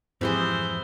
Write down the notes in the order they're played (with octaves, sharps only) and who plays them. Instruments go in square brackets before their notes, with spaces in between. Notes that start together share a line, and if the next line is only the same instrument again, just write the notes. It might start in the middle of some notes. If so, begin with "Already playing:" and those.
[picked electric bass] F2 G#2 F3 [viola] E3 C5 [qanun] C4 G4 G#4